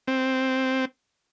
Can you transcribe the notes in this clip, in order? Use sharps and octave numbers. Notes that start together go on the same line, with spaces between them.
C4